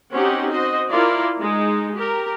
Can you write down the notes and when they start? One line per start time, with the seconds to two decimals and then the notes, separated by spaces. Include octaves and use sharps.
0.14 C4 C#4 D#4 F#4 G4 F#5
0.50 F#4 C5 D#5
0.89 E4 F4 A#4 D5
1.40 G#3 D#4
1.96 G4 A#4